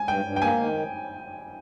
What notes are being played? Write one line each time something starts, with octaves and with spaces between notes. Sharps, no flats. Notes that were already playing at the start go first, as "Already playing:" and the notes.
Already playing: G#5
G2 G5
G2
G5
A#3 G#5
D#3